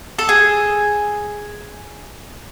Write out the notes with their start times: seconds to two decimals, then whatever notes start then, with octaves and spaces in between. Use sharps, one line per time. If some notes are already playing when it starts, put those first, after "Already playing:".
0.19 A4
0.29 G#4